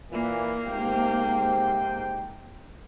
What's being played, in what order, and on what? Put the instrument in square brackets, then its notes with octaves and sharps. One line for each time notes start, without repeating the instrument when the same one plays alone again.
[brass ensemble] A#2 E3 [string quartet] A#3
[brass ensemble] G#2 C3 G5